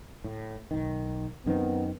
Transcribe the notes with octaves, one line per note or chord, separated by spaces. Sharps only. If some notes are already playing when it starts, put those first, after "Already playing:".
A2
B1 D#3
F#2 D#3 B3 C4